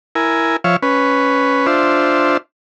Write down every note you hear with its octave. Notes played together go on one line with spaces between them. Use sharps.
E4 A#4 G#5
F3 C#5 E5 F5
C#4 B4
D4 F4 C5 E5